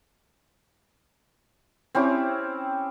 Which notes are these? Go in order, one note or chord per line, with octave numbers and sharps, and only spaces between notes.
C4 C#4 E4 G4